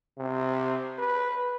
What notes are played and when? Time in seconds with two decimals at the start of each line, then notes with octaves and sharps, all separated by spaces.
0.18 C3
0.99 B4